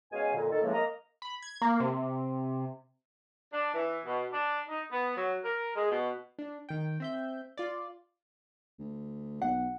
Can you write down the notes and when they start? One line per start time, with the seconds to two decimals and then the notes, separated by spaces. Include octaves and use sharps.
0.12 B2 G#3 C#4 F5 G#5
0.34 F2 A#2 D3
0.50 D#3 A4
0.62 A2 C#3 E3 F3 G#3 A#3
0.73 A#3 D#5 A#5
1.22 B5
1.42 G#6
1.62 A#3
1.80 C3
3.52 D4
3.75 E3
4.06 B2
4.33 D4
4.69 D#4
4.92 B3
5.17 F#3
5.44 A#4
5.76 G#3
5.91 B2
6.39 D4
6.69 D#3 G5
7.00 C4 E5 G6
7.57 F4 D5
8.79 D2
9.42 B1 F#5